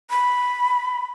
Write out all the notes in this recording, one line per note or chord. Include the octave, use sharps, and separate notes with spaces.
B5